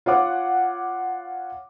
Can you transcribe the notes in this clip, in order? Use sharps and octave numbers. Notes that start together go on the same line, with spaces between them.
F4 C#5 F#5 D6